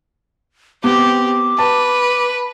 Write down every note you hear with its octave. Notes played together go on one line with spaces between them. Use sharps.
B3 C4 G4 D6
B4 A5